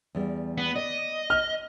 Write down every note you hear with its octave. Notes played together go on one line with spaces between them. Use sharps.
E2 G3
B3
D5 D#5
F6